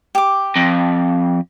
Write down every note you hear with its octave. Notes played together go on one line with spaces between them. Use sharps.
G4 D6
F2